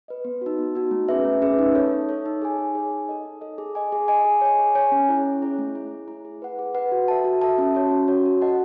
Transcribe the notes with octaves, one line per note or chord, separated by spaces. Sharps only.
B4 D#5
B3
D#4 F#4
B3
D#4 F#4
A3
C#4 G#4 B4 E5
A3
C#4 G#4 B4 E5
D#4
A4 C#5
D#4
A4 C#5
D#4
G#4 C#5 G#5
D#4
G#4 C#5 G#5
D#4
A4 D#5
D#4
A4 D#5
G#4
D#5 G#5
G#4
D#5 G#5
G#4
C#5 G#5
G#4
C#5 G#5
C#4
E4 G#4 C#5
C#4
E4 G#4 C#5
A3
E4 G#4
A3
E4
G#4
G#4
B4 F#5
G#4
B4 F#5
F#4
A4 E5 A5
F#4
A4 E5 A5
C#4
F#4 C#5
C#4
F#4 C#5
F#4
A4 D#5 F#5 A5